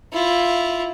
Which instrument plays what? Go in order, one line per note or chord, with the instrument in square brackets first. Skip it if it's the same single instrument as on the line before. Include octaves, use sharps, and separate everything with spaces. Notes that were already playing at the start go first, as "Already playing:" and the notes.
[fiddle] E4 F4